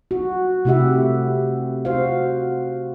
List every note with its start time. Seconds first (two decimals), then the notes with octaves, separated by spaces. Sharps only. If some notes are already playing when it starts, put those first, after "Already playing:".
0.11 F#4
0.65 C3 A3 E4 G4 E5 F#5
1.85 F#4 C5 F5